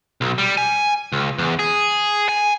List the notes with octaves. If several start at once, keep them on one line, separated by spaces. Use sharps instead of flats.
B1
G3
G#5
C#2
E2
G#4
G#5